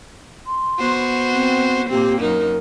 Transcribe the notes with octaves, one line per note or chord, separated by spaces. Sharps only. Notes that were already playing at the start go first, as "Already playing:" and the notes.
C6
B3 F#4 C5
C4
A#2 A#3 C4 G4
F#2 D#4 A#4